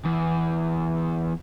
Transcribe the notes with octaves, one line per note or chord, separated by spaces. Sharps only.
E2